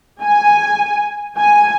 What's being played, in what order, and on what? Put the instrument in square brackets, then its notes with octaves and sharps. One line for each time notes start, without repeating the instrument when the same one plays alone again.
[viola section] G#5
G#5